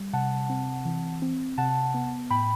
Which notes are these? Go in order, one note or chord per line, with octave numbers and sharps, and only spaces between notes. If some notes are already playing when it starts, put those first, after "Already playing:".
Already playing: G3
C3 F#5 A5
C4
E3
C4
C3 F#5 A5
B3
A2 G5 B5